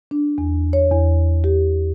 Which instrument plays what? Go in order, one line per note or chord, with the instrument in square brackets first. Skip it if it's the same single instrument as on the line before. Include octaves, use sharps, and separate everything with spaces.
[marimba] D4
E2
C#5
E2
G4